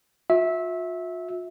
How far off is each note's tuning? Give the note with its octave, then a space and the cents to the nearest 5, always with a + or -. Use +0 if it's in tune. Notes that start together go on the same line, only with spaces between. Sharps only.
F4 +45 E5 -15